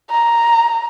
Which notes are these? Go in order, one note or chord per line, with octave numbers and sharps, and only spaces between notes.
A#5